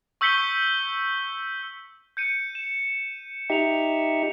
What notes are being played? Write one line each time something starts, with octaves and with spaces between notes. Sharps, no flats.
C#6 E6 G6 B6 C#7 G7
G6 C#7 D#7
E7
D#4 G4 E5 C#7 F7